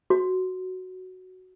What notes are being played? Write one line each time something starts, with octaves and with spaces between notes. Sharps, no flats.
F#4